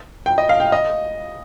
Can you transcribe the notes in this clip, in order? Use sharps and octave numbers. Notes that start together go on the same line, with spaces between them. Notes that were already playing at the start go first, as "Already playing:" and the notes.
G5
D#5
F5
G5
D#5